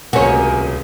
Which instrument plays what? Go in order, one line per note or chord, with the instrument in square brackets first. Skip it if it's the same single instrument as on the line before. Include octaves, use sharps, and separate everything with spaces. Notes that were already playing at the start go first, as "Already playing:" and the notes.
[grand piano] D#1 C#2 C3 [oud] F#4 C#5 [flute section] A#4 G#5